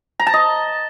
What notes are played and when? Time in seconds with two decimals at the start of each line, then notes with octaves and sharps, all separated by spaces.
0.20 A#5
0.27 A5
0.34 D#5